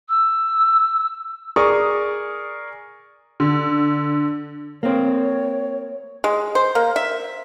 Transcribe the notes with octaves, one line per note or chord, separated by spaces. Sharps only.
E6
G#4 A#4 D5 C#6 D#6
D3
A#3 C4 C#5
G#3
C5
A#3
E5